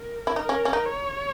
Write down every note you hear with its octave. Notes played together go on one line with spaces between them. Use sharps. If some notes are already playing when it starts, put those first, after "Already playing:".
Already playing: A#4
E4
D#4 A#4
C#4
C#4
D#4
C#5